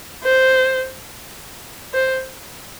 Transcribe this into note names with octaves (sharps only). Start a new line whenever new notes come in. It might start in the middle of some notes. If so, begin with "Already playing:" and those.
C5
C5